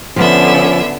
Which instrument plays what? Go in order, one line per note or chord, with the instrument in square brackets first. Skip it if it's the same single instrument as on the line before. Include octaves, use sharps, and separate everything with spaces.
[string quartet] D3 B3 E5 [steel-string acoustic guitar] F3 [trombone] C#4